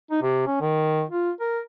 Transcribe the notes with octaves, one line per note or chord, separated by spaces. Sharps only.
D#4
C3
C#4
D#3
F4
A#4